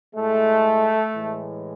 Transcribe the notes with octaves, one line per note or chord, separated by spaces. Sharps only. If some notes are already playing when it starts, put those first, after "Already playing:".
A2 G#3 A3
A2 E3 G#3